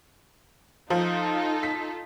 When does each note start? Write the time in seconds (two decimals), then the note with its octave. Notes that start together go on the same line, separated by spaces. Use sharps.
0.90 F3 D#4 F4 A4
1.63 B6